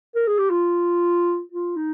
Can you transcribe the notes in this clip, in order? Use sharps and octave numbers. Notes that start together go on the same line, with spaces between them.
A#4
G#4
G4
F4
F4
D#4